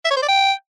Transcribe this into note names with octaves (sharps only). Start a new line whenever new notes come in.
E5
C#5
C5
D5
G5